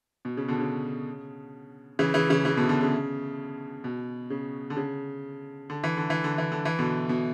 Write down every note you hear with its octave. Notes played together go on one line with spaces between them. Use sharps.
B2
C#3
B2 D3
C#3
C#3 E3
C#3 E3
C#3 E3
C#3 E3
B2 D3
B2 D3
C#3
B2
C#3
D3
C#3
D3
E3
D3
E3
D3
E3
D3
E3
B2 D3
B2